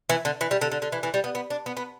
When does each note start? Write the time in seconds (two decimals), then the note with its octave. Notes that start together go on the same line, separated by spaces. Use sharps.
0.09 E3
0.25 D3
0.41 E3
0.51 G3
0.61 D3
0.72 D3
0.82 D3
0.92 E3
1.03 E3
1.14 G3
1.24 B3
1.35 B3
1.50 D4
1.66 B3
1.77 B3